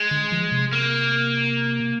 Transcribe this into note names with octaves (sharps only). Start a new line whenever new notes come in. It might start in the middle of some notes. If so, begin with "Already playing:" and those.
Already playing: G#3
D3
F3
C3
A#3